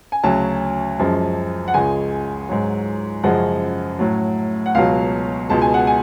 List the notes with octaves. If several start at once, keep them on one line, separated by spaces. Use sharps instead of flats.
G#5
D2 C#3 F#3 A5
F#2 F3 G#3
F#5
C#2 C#3 G#3 G#5
G#2 F#3
F#2 C#3 F3 G#3 F#5
A2 F#3
F#5
C#2 B2 F#3 F5
C#2 B2 G#3 A5
G#5
F#5
G#5